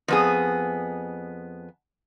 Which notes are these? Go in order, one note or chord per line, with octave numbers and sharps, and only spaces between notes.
F2 B3 G#4